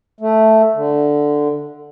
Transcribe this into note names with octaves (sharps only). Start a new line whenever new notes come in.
A3
D3